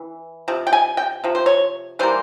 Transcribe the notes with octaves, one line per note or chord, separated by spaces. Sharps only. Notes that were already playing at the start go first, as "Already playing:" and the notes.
Already playing: E3
C3 F3
G5
G#5
G5
C3 F3
C5
C#5
E3 G3 A#3 C5